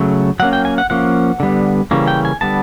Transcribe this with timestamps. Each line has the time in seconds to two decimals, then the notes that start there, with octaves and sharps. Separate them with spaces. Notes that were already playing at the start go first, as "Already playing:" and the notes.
Already playing: C#3 F#3 A3
0.40 F#3 A#3 C#4 F#5
0.53 G5
0.65 G#5
0.78 F#5
0.90 F3 A#3 C#4 F#5
1.40 D3 G3 B3
1.91 C#3 E3 G3 A#3 C#4
2.08 G5
2.25 G#5
2.41 D3 G3 B3 A5